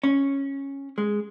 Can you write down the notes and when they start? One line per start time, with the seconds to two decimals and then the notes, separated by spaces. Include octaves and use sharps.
0.04 C#4
0.98 G#3